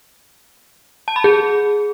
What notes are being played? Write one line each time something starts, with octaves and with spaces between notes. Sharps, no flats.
A5
B5
G#4